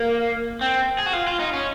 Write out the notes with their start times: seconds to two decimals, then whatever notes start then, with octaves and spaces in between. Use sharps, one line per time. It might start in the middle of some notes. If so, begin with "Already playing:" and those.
Already playing: A#3
0.61 C4
0.98 G#4
1.06 F#4
1.13 F4
1.27 F4
1.40 D#4
1.53 C#4